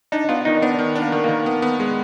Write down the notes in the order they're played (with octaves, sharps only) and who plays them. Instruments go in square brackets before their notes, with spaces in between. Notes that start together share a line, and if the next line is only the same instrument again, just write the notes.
[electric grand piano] D4 [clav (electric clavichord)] D#4
[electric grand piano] B3 [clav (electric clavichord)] F4
[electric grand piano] D#3 [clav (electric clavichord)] D#4
[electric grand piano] B3 [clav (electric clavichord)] D4
[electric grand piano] D#3
D4
[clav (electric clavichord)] A#3
[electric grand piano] D#3
[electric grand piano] D#3 [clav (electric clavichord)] A#3
[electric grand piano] B3
B3
G#3